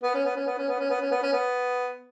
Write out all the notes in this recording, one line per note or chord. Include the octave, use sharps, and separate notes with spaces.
B3
C#4
B3
C#4
B3
C#4
B3
C#4
B3
C#4
B3
C#4
B3